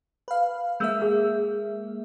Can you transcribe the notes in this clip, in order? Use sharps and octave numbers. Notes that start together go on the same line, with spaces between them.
B4 F5
G#3 A#3 E5 E6 G6
G#4